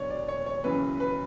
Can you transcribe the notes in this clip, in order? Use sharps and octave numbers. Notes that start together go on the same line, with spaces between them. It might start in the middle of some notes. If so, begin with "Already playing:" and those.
Already playing: E1 D2 D3 F#3 C#5 D5
D5
C#5
C#5
F#1 F#2 C#3 E3 B4
B4